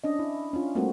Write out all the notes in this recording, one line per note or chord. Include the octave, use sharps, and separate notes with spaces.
C#4 D4 D#5
E4
C#4 D4 F4
G3 A3 A#3 C4 F#4